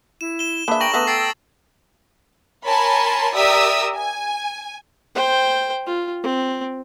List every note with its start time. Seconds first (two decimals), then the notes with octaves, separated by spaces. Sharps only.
0.21 E4 E7
0.39 E7 G7
0.68 A#3 D4 G#4 B4 E5
0.80 A#4 G5 C#6 A#6 F#7
0.94 A3 B3 A4 B4 A#5 D#6
1.07 G5 E6 A6 C7
2.66 A#4 C#5 G#5 A5 B5 C6
3.35 G4 A#4 D5 E5 D#6 E6
3.97 G#5
5.15 C5 G5
5.87 F4
6.23 C4